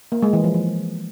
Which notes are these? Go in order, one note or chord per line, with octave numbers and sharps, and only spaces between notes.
A#3
G#3
E3
F3
F3